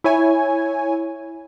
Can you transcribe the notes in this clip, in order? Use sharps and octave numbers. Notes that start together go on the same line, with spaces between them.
E4 C#5 G#5